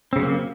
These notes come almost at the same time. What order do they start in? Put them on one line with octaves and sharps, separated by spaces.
C4 C#3 F#3 A#3